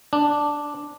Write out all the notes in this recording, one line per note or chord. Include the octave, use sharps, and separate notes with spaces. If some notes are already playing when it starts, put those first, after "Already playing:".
D4